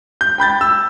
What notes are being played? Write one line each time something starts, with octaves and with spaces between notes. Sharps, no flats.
G6
G5 B5 G6 A6
E6